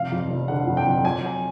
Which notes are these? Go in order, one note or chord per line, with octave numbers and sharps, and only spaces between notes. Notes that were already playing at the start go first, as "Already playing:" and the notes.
Already playing: F1 F5
F2
F1
D3 F#5
F2
G5
F2
F#3 G#5
F#3